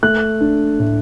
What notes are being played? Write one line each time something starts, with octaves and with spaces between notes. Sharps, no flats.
A3 F#6
D4
A2